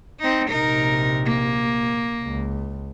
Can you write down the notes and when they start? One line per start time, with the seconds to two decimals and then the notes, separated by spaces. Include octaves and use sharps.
0.20 C4 D#4
0.49 A#1 C3 D#4 A#4
1.25 A#3
2.23 C#2